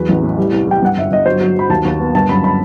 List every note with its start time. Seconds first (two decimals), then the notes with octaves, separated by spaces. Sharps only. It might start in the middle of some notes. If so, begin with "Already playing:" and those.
Already playing: E2 F#3 B4
0.09 A1
0.23 A2
0.38 G3
0.52 C2
0.67 G3 G5
0.82 G2 F#5
0.97 G1 E5
1.11 G1 D#5
1.26 F#3 C5
1.41 F#3
1.56 F#3 B5
1.70 D#2 A5
1.85 D#2
2.00 B3
2.14 G1 A5
2.29 F#2 B5
2.44 B5